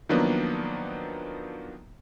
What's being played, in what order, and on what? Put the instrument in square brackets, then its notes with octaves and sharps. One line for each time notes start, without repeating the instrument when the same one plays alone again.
[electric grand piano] D#3 F3 F#3 A#3 B3 D4